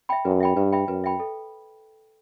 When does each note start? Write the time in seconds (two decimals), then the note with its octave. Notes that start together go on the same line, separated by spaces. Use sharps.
0.09 E5 G5 B5
0.25 F#2 B4
0.40 E5 G5 B5
0.56 G2 B4
0.72 E5 G5 B5
0.88 F#2 B4
1.04 E5 G5 B5
1.19 A4